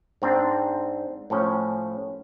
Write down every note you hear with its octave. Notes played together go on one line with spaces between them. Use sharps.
G#2 C4 D4
A2 F3 C#4